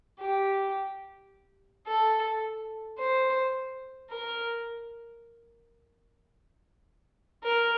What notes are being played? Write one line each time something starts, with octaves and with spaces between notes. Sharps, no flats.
G4
A4
C5
A#4
A#4